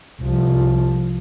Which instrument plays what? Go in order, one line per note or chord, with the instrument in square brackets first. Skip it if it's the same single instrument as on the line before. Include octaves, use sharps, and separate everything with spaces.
[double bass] C2 F3